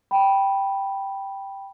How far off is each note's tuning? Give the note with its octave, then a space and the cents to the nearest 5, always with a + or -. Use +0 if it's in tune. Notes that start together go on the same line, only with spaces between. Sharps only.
G5 +0 B5 -10